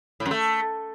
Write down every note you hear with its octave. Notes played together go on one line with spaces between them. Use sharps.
A2
F#2
A3